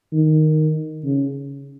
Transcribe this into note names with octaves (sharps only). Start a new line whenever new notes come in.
D#3
C#3